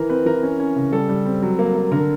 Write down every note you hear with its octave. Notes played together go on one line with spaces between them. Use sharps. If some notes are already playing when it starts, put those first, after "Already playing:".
Already playing: E3 A#4
C4 B4
E3 A#4
C#4
C#4
C#3
G3 A4
G3
C4
F#3
A#3
A#3
D3 A#4